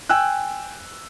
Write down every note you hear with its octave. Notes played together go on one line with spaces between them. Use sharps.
G5 G#5 E6 F#6